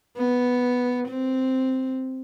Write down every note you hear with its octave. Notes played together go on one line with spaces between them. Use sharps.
B3
C4